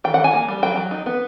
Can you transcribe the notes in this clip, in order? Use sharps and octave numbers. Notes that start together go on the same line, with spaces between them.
D#3 G5
F#5
D#3 G#5
A#3
G3
F#3 G5
F#3
D#4
B3